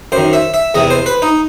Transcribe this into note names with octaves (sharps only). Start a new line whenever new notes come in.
F#2 D#3 C5
E5
E5
E2 C3 E3 D#5
C5
B4
D#4